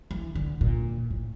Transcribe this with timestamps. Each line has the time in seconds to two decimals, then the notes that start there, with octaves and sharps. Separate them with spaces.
0.11 E3
0.35 D3
0.61 A#2
1.11 A2